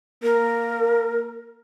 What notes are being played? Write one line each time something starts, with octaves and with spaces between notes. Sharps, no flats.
A#3 A#4